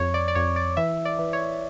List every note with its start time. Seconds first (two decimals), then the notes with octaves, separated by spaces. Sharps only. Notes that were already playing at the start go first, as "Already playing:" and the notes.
Already playing: F2 C#5
0.14 D5
0.28 D5
0.35 F2 C#5
0.56 D5
0.77 E3 E5
1.05 D5
1.19 E3
1.33 C#5